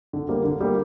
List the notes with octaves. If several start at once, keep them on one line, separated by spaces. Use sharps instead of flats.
D3
G3 A#3
D3
G3 A#3